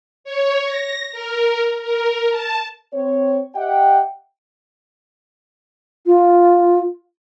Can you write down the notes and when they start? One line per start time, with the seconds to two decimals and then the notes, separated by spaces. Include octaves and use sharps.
0.24 C#5
0.65 A#6
1.12 A#4
1.82 A#4
2.31 A5
2.94 C4 C#5
3.55 G4 D#5 E5 F#5 G5
6.06 F4